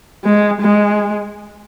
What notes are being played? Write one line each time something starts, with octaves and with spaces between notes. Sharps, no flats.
G#3
G#3